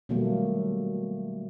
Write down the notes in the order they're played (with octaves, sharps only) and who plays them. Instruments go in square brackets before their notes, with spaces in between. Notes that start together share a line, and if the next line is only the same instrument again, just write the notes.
[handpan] B2 D#3 F#3 G3 A3 A#3